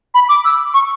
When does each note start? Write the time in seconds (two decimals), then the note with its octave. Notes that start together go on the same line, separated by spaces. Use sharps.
0.14 B5
0.29 D6
0.45 E6
0.74 C#6